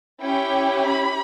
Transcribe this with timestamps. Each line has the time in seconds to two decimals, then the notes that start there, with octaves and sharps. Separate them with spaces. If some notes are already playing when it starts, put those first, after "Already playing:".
0.22 C#4 E4 G4 G5
0.88 B5